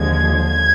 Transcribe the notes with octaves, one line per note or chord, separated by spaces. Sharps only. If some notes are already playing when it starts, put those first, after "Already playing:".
Already playing: D#2 D3 F3 G#3 G#6
G#6